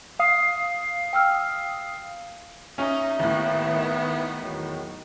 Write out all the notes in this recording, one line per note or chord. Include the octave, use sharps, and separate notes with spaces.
F5 D#6 C7
G5 E6 F6
C#4 D#4 E5
D#2 A2 B3
D#3
E2 D#3 F#3